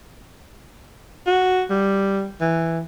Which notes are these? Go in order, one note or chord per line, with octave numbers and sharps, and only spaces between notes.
F#4
G3
E3